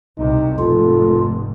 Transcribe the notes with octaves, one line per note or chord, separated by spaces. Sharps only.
C2 C3 D#4
F1 G#2 F4 A4